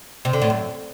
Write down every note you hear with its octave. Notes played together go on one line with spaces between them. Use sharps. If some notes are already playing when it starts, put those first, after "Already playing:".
C3
D3
A2
F#2